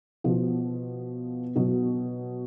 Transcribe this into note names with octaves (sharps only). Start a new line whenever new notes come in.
B2 F3
B2 F#3